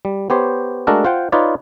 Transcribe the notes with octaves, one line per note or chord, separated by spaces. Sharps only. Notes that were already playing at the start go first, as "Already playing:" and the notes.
G3
B3 G4 C5 C#5
G#3 A3 D4 F#4 A4 A#4
F4 C5 F#5 G5
D#4 F4 B4 C#5 D5